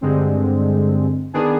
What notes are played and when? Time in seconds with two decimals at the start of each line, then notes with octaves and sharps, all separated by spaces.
0.01 G2 D3 G#3 C4
1.33 D#3 B3 D4 G#4